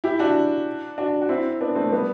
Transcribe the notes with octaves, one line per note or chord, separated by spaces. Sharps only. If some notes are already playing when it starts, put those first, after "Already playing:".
E4 G4
D4 F#4
D4 F#4
F#4
C4 E4
B3 D4
A3 C4
G3 B3